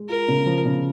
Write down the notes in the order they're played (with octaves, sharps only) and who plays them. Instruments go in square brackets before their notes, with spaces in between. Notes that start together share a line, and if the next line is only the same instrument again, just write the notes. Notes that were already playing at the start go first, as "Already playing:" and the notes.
Already playing: [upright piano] G#3
[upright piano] F4 [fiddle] A#4
[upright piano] C#3
F3
C#3